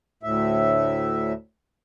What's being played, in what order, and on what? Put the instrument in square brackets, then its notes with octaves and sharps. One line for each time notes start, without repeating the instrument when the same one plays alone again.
[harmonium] D2 A2 E5